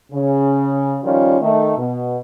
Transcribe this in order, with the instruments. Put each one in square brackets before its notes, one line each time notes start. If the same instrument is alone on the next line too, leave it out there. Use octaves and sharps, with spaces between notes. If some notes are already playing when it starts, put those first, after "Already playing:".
[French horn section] C#3
D#3 F3 G3 C#4 F4
D#3 A3
B2